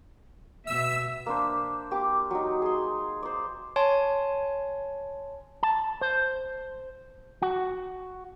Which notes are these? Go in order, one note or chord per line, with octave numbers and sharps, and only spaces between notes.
B2 E5 E6
A#3 D4 C5
A#3 G4 D6
F#3 D#4
G#4 C6
C5 D5
C#5 G#5 A5 C6
A5
C5
F#4